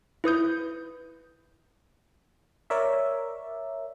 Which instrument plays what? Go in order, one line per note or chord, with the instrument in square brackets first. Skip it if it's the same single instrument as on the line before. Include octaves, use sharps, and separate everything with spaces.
[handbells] E4 B4 D#6 G6
[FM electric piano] A#4 C#5 D5 E5